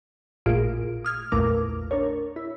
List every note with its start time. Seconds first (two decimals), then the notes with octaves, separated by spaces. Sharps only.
0.46 A1 A#2 F4 G#4 D7
1.05 D#6 F6 G#6
1.32 A#1 E2 A#2 A3 A#4 D6
1.91 D4 A#4 C#5
2.36 E4